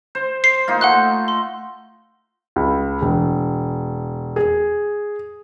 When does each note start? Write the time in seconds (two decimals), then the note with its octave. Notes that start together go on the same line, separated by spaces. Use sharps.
0.15 C5
0.44 C7
0.68 A#3 D#4 F4
0.81 A3 F#5 C6 F#6
1.28 C6
2.56 C#2
3.02 E1
4.36 G#4